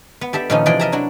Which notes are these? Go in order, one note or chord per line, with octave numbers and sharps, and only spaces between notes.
B3
G4 A4 D5 E5
A#2 D#3 F3 B3 C#4 D#4
C3 E3 F3 G#4 D5 G5
A#4 D#5 E5 A5 A#5
F#3 D4 E4 F#4